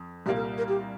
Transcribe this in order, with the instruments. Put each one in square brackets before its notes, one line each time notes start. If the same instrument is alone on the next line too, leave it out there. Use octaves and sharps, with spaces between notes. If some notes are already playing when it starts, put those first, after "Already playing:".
Already playing: [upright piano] F2
[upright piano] C2 A#2 G3 A#3 [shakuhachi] G4
[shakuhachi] A#4
A#4
G4